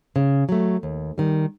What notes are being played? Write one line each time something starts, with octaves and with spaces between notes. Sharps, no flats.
C#3
F#3 A3
D#2
D#3 G3